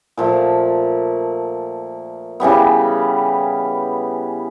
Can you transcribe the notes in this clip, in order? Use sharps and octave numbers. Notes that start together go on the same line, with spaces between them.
A#2 F3 A3
C#3 E3 G3 B3